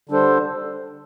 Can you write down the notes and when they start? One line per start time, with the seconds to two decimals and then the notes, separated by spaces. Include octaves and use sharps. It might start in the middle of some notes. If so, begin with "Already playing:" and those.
0.09 D3 G3 D4 A4 C5